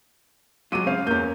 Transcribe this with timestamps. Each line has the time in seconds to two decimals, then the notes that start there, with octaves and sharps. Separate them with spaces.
0.72 F#3 G#3 F4 D6 D#7
0.86 C#3 C5 F5
1.07 E2 A#3 C#4 G6